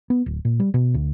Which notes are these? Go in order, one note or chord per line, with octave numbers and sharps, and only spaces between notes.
B3
D1
A#2
G3
B2
D2